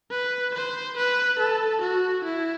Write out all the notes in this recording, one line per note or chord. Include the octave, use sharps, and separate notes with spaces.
B4
C5
B4
A4
F#4
E4